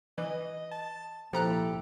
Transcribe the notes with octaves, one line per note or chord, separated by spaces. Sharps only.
E3 D#5
A5
A#2 F3 E4 G4 A4 A#5 F#6